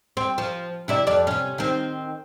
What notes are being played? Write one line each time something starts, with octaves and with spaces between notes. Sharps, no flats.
C4
F3
C3 E4 D5
F2 D5
C3 C#4
D#3 C4